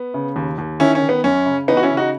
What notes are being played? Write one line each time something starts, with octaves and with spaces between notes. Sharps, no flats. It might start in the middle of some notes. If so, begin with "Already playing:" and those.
Already playing: B3
C#3
D#2
D#2
D#3 C#4 E4
C#4
D#3
B3
F#2 C#4
C#3
E3 B3 D#4
F#4
C#4 E4
C#3
D#4 F#4